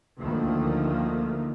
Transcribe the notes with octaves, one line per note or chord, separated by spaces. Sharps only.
D2 D#3 F3 A3 A#3